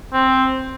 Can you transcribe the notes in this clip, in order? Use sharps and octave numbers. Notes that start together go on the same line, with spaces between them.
C4